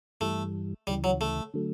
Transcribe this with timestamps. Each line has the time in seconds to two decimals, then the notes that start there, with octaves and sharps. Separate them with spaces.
0.21 G2 E3 G3 A3
0.87 D2 C#3 E3 G3
1.04 F#3
1.21 A3
1.54 D3 F#3 A3